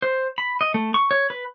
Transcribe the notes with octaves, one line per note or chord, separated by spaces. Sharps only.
C5
B5
D#5
A3
C#6
C#5
B4